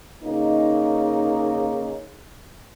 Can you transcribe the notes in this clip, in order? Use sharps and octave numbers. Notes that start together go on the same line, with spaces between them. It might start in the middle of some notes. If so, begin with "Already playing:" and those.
C#3 A#3 D#4